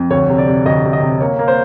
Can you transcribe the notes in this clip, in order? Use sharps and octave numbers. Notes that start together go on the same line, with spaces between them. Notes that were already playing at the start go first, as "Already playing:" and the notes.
Already playing: F2
D2 C#5
C3
D5
C3
D2 D#5
C3
D#5
C3
A#3 C#5
A#3
C5